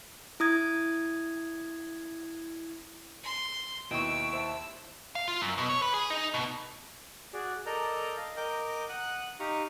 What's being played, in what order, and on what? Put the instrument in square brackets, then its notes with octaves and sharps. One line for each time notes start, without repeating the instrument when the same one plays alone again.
[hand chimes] E4 D#6 G#6
[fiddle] C6
[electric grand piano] D#2 E4 C#6 [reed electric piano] B2 D#5 G5 [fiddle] E6 [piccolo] D7
[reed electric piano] C5 E5 A5
[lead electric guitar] F5
F4
F#2
B2
C#5
B4
G#4
D#4
B2
[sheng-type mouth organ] F#4 G#4 D5
A4 A#4 D5 D#5 A#5 G6
D#5 F5
A#4 D#5 G5 D6 G6
F#5 D#6 F#6
D#4 G4 F5 A#5 C#6 D#6